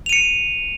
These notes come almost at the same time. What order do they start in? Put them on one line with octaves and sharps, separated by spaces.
F7 D#7 C#7